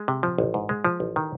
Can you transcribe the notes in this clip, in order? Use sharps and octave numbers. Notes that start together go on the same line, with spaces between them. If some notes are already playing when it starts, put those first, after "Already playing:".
Already playing: G#3
C3
F3
A1
G#2
G#3
F3
A1
D#3